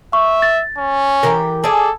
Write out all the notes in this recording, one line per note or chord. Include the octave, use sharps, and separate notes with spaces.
E5 C#6
A6
C#4
E3 G4 A#4
G#4 A4 D5